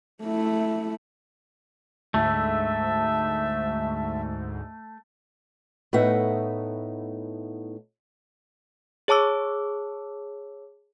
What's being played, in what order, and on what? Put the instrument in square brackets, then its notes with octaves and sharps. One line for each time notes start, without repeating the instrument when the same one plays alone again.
[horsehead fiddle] A3 E4
[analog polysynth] D2 G#2 [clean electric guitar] A3 [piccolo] E5
[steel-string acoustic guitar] A2 A3 B3 D#4 E5 F#5
[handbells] G#4 C#5 A5 D6 E6